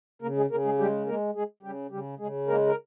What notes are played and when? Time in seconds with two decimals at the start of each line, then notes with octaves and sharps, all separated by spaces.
0.22 C#3 A#3 A#4
0.36 G#3 G#4
0.50 C#3 A#3 A#4
0.65 G#3 G#4
0.78 G3 G#3 G4
1.06 G#3 A#3 A#4
1.35 G#3 G#4
1.63 C#3 G3 G4
1.91 C#3 G3 G4
2.19 C#3 G#3 G#4
2.47 G#3 A#3 A#4
2.67 A#4